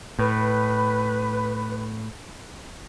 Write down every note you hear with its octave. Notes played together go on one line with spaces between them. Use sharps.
A2 B4